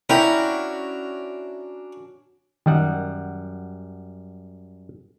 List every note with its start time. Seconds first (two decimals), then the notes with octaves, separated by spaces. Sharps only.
0.10 C#4 D4 E4 F#4 A#4 G5 B5
2.66 F#2 D#3 G3 F#5